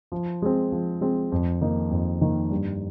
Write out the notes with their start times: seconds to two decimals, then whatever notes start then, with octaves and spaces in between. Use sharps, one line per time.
0.12 F3
0.42 G#3 C4
0.72 F3
1.01 G#3 C4
1.32 F2
1.61 D#3 A#3 D#4
1.91 F2
2.21 D#3 A#3 D#4
2.51 G2